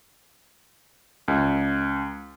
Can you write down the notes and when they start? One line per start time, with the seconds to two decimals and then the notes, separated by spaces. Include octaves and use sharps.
1.28 C#2